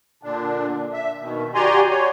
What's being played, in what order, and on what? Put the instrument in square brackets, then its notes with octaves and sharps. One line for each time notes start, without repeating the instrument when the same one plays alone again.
[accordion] A#2 D3 D4
E5
B2 D#3
F#4 G4 D5 G#5 A#5 C6
C#5